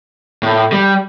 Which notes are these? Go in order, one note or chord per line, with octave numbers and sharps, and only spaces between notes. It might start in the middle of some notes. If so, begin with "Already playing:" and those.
A2
G3